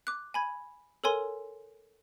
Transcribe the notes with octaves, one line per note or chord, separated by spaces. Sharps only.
D6 F#6
G#5 B5 G#6
A4 A#4 C#5 G#5 C6